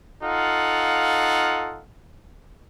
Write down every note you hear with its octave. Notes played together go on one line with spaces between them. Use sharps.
D#4 F4 A4 F5 F#5